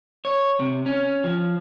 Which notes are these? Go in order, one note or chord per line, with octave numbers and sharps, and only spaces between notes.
C#5
C3
C#4
F3